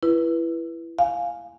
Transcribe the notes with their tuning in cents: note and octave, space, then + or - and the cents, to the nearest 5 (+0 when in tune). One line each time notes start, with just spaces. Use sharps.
E4 +20 B4 -15
F5 +10 G#5 +0